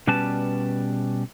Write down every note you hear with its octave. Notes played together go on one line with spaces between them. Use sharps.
B2 G3 C#4 B4 D5 A5